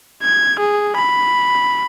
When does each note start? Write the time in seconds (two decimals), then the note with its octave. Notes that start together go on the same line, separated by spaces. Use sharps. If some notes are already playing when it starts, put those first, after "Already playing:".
0.23 G#6
0.59 G#4
0.97 B5